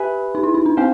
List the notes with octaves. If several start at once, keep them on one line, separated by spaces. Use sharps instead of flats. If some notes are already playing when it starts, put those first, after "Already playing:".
Already playing: G4 B4 E5 G#5 B5
D#4
E4
D#4
D4
C4 G4 C5 F5